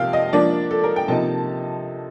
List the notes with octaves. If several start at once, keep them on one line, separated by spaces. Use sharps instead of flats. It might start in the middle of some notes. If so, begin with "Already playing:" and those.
Already playing: C3 F3 A#3 F5 G5
D#5
F3 A#3 D4 D5
A4
A#4
G5
C3 F3 A#3 D#4 A5